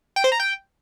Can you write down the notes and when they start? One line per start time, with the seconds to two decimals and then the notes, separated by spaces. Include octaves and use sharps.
0.16 G5
0.24 C5
0.32 A#5
0.40 G5